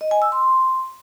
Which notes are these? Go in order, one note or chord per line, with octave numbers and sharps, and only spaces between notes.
D#5
G#5
E6
C6